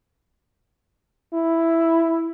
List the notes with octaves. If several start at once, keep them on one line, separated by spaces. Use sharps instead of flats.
E4